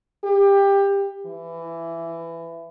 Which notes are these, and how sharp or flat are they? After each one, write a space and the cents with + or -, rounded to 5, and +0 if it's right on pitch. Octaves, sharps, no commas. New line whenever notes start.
G4 +20
E3 +15